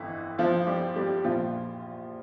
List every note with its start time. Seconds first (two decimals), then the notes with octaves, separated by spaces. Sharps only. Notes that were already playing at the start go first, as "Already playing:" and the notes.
Already playing: G1 F2 E3 E4
0.39 F3 F4
0.67 G3 G4
0.96 G3 G4
1.24 A#1 A#2 F3 F4